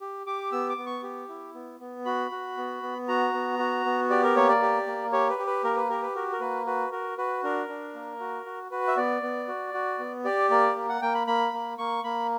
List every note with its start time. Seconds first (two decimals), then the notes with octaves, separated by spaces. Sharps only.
0.01 G4
0.26 G4 D6
0.52 B3 E6
0.69 D6
0.77 B3
0.86 C#6
1.03 G4
1.29 E4
1.55 B3
1.80 B3
2.05 F#4 B5
2.31 F#4
2.57 B3
2.83 B3
3.08 F#4 A#5
3.34 B3
3.59 F#4
3.85 B3
4.10 G4 D5
4.23 A#4
4.36 A#3 C#5
4.49 D5
4.62 G4
4.87 A#3
5.12 G4 C#5
5.30 B4
5.38 G4
5.47 B4
5.64 A#3 A#4
5.77 B4
5.90 G4 A#4
6.02 B4
6.15 F#4 A#4
6.32 A#4
6.40 A#3 B4
6.66 F#4 B4
6.92 F#4 A#4
7.18 F#4 B4
7.43 D4 A#4
7.69 D4
7.94 A#3
8.20 F#4
8.46 F#4
8.71 F#4 B4
8.87 E5
8.97 B3 D5
9.22 B3
9.48 F#4
9.74 F#4
9.99 B3
10.25 G4 D5
10.50 A#3 D5
10.76 A#3
10.89 F#5
11.02 A#3 G5
11.14 B5
11.27 A#3 B5
11.53 A#3
11.78 A#3 C#6
12.04 A#3 B5